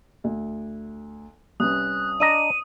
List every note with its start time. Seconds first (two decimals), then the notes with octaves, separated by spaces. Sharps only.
0.24 D2
1.60 C2 C#4 B4 D#6 F#6
2.20 D4 D#5 A#5 D#7